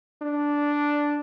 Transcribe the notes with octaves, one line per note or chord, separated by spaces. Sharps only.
D4